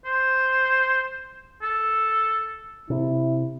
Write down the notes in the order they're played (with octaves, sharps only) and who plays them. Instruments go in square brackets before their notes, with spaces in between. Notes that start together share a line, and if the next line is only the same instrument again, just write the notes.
[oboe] C5
A4
[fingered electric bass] C3 [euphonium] E4